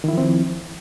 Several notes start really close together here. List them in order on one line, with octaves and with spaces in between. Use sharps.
D#3 E4 F3 C4